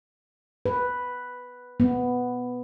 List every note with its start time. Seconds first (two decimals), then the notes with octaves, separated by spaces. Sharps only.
0.66 B4
1.80 B3